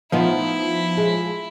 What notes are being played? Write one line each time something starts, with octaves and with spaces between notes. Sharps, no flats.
F3 B3 D#4 E4
G#3